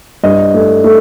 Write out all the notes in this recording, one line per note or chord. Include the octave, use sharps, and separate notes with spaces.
G2 D#5
A3
A3